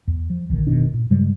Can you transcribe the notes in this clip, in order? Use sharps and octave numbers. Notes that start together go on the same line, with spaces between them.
E2
F3
D1 A#1 D3 D#3
F#1 B2 D#3 D4
A#2
G2 C#3 G3 G#3